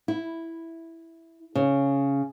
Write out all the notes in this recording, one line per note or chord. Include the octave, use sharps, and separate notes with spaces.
E4
C#3